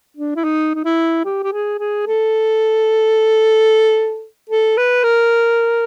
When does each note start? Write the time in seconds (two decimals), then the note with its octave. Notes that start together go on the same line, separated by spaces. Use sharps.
0.17 D4
0.36 E4
0.44 D#4
0.75 D#4
0.85 E4
1.25 G4
1.43 G4
1.52 G#4
1.79 G#4
2.07 A4
4.50 A4
4.77 B4
5.04 A#4